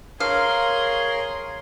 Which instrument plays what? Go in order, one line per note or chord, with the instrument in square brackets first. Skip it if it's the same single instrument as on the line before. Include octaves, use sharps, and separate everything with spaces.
[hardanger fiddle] G#4 C6 [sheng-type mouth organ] A#4 C#5 [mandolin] F5